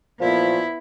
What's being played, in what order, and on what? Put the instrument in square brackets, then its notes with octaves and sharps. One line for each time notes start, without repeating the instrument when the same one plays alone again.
[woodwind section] A#2 F3 [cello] B3 E4